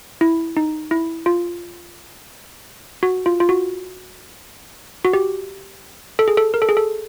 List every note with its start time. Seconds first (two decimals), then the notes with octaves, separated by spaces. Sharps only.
0.21 E4
0.57 D#4
0.91 E4
1.26 F4
3.03 F#4
3.26 F4
3.40 F4
3.49 F#4
5.05 F#4
5.13 G4
6.19 A4
6.28 G#4
6.37 A4
6.54 A#4
6.62 A4
6.69 G#4
6.77 A4